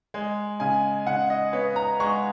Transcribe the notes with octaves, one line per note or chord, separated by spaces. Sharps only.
G#3
C#3 G#5
C#3 F#5
D#5
B3 C#5
A#5
G#3 C#6